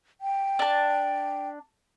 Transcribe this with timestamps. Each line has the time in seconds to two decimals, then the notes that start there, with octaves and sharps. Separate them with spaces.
0.21 G5
0.59 D4 A5